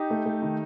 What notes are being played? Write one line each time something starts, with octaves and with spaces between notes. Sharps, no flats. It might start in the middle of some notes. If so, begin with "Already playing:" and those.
Already playing: D#4 G4
A3
A3
D#3